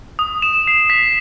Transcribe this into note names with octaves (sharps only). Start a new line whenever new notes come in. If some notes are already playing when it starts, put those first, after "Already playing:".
D#6
E7
C7
B6